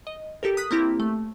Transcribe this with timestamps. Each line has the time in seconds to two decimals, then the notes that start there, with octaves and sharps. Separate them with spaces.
0.07 D#5
0.43 G4 A4 A#4
0.57 D#6 F#6 B6
0.71 A#3 C4 E4 G4
1.00 A3